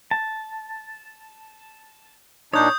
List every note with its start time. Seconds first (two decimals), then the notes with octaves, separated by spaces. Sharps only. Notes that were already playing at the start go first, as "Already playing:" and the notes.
0.11 A5
2.54 A#2 D4 D#4 C#5 D#6 G6